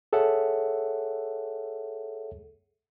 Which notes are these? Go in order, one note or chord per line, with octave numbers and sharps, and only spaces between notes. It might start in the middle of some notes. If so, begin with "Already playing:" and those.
G#4 A4 C#5 E5 F#5